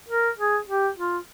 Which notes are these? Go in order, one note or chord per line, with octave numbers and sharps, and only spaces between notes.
A#4
G#4
G4
F4